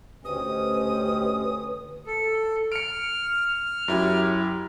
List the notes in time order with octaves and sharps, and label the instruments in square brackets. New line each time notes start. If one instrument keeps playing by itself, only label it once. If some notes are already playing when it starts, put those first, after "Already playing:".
[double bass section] D2 C#4 [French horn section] G4 C5 D#5 [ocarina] B4 [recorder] D#6
[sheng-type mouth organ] A4
[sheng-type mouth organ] F6 [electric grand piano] C#7 D7
[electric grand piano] F#2 E4 G4